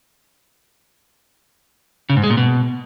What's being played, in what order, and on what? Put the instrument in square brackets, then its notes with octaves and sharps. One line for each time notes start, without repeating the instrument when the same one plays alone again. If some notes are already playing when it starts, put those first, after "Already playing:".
[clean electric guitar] C#3
G#2
G#3
A#2
B2